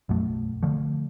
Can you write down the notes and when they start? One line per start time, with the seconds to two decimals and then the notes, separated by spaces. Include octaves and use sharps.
0.09 B1 F#2 F#3 A3
0.63 D3 F3 A3